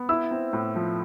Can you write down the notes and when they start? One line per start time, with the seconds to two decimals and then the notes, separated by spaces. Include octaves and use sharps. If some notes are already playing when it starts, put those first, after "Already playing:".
Already playing: B3
0.09 E4 E6
0.31 C4
0.53 A2
0.76 F3